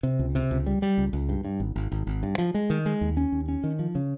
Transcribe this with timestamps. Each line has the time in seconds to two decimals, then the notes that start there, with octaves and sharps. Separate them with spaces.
0.03 C3
0.19 C#2
0.35 C3
0.51 C#2
0.66 G3
0.82 G3
0.98 C#2
1.13 C#2
1.29 G2
1.45 G2
1.60 G#1
1.76 G#1
1.92 G#1
2.07 G#1
2.23 G2
2.38 F3
2.54 G#3
2.70 D#3
2.86 G#3
3.01 D#2
3.17 C#4
3.32 D#2
3.48 C#4
3.64 D#3
3.79 F3
3.95 C#3